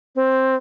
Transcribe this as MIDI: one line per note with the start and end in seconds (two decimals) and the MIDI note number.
0.15 0.55 60